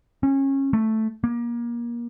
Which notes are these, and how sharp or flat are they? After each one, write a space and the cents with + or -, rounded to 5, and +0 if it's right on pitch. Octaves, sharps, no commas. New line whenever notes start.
C#4 -25
A3 +0
A#3 +25